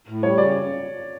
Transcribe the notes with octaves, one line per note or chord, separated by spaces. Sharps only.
A2
G3 C#5
C#3 D5